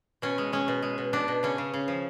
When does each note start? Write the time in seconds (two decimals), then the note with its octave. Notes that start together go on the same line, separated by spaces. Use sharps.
0.22 B2 C#4
0.38 G#3
0.53 G#3 C#4
0.68 B2
0.83 G#3
0.98 B2
1.13 B2 D4
1.28 B2
1.43 C#3 C#4
1.58 C#3
1.74 C#3
1.88 F3